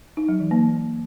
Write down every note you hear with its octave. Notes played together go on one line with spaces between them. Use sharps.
D#4
F#3
E3
A#3